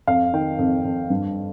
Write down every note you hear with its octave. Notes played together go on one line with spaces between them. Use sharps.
F2 F5
D#3 G5
F2
F2
G2